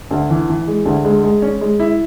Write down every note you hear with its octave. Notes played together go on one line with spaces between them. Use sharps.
D2
E3
E3
G#3
D2
G#3
G#3
C#4
G#3
E4